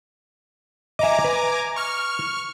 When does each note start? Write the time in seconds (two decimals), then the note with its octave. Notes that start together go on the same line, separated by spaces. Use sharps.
0.99 D#5 E5 G#5 A#5 D6
1.24 B4
1.76 C#6 F6